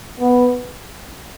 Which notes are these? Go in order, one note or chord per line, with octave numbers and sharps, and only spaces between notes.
B3